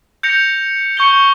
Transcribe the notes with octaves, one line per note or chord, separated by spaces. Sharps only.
G6 A#6 C#7 F7
C#6 G6 C#7 G7